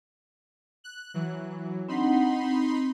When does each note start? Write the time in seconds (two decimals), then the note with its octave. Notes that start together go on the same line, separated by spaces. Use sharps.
0.84 F#6
1.14 E3 F#3
1.89 C4 D4 D#4 F#5 B5 C6
2.44 C4